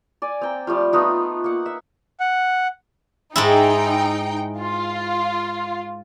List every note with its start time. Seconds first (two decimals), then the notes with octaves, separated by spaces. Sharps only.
0.22 D5 G#5
0.41 C4 G5 A#5
0.67 F3 G3 A3 F4
0.93 A3 B3 D#4 F4
1.44 A#3 F#5
1.66 E5
2.20 F#5
3.36 G#2 G#3 D#4 E4 G5
4.59 F4